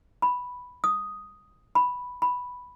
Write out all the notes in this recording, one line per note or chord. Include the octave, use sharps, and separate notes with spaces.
B5
D#6
B5
B5